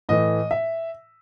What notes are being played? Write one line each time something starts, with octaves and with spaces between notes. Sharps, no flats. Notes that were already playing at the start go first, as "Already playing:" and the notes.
A2 E3 A3 D#5
E5